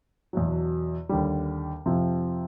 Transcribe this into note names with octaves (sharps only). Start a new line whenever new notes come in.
E2 B2 F#3
D#2 D3 G3
F2 C3 F3